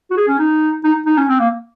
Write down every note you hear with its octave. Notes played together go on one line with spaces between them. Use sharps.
F#4
G#4
C#4
D#4
D#4
D#4
C#4
C4
A#3